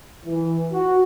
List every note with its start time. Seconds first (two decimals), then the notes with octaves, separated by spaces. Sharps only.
0.25 E3
0.71 F#4